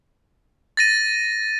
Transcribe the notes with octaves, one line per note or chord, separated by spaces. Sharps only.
A6 A#6 D#7